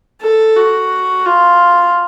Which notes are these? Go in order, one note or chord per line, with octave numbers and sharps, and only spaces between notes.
A4
F#4
F4